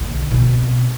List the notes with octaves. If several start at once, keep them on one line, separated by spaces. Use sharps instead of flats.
B1 D3
B2 C4